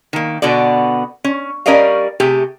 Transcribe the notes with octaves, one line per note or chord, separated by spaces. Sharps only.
D#3 A#3
B2 D3 B3 F#4 D5
C#4
G3 C#4 A#4 D5 D#5 F5
C3 A3 G4 G#4